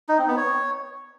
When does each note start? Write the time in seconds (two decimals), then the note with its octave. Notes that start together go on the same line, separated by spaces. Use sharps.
0.09 D#4
0.18 C4
0.28 B3
0.37 C#5